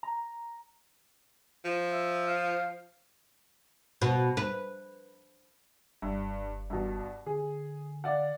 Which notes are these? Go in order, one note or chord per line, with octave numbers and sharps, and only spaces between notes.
A#5
F3
E5
F5
B2
B4
F#1 G2
G2 B2
D3 G#4
D5 F5 F#5